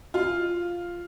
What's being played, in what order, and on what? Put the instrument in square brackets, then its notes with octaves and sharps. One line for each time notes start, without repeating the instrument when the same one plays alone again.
[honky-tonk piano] F4